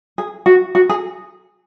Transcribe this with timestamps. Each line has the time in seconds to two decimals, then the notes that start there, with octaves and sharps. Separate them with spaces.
0.18 G#4
0.46 F#4
0.75 F#4
0.89 G#4